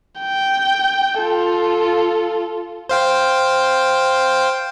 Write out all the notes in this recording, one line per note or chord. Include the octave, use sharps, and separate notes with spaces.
G5
F4 A4
C5 F5 G5